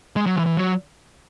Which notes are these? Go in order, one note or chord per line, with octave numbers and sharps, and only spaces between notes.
G#3
F#3
E3
E3
F#3